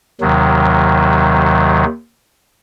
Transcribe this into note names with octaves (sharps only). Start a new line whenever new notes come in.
D#2 C3 D#3 F#3